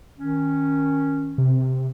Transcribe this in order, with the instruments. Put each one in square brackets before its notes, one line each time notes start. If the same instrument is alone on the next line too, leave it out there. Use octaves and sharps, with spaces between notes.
[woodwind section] D#3 C#4
[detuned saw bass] C3